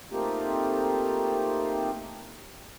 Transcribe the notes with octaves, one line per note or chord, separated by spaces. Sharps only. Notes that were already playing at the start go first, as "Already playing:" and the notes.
A3 A#3 C4 D#4 F4 G4